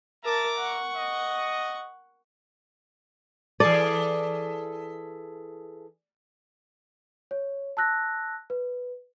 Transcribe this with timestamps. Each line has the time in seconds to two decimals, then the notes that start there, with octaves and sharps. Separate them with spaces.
0.24 A#4 E5 A5 A#5 D6
0.58 F#5 C#6
0.94 D#5
3.60 E3 G#4 A4 D5
7.31 C#5
7.77 A5 E6 F#6 A#6
8.50 B4